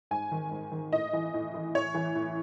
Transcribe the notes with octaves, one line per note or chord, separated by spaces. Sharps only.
G#2 G#5
D#3
G#2
D#3
A2 D#5
E3
A2
E3
A2 C#5
E3
A2